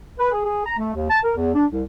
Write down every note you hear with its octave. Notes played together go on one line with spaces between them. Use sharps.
B4
G#4
G#4
A#5
A3
D#2
A5
A#4
E2
D4
C2